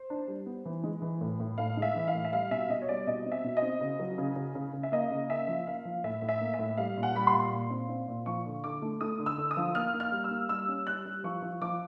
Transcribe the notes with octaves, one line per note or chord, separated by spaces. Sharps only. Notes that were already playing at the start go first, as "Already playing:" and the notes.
Already playing: C5
D4
G3
B3
E3
G#3
E3
A2
A2
A2 F5
G#3 E5
E3
F5
A2
E5
G3 F5
B2 E5
B2 D#5
C#5
G3 D5
B2 D#5
C4
E5
B2
D#5
C4
C#3
F#3
C#3
C#3
C#3
C#3
E5
A#3 D#5
C#3
A#3 E5
F3
A#3 F5
F3
A2 E5
A2
E5
A#3
E5
A2
G3 F5
A#2
F#5
G3 B5
C6
A#2
A#2
C4
C4
A#2
F3 C#6
D3
D3 D6
A3
A3 D#6
D3
E6
D3
D#6
F3
A#3 F6
A#3
F6
G3
E6
A#3
G3 E6
C#4
G3 F#6
G3
F3 C#6
F3
F3 D6